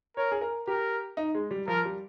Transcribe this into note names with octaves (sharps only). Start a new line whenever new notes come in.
A#4 C#5
G#4
A#4
G4 A#4
D#4
G#3
G3
F3 A#4
G3